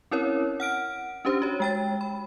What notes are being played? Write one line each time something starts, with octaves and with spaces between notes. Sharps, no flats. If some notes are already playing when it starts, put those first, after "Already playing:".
C4 C#4 E4 A#4 C#5
F#5 F6 D7
C#4 D4 G4 C5
F#4 C#5
G#3 G5 A6
B5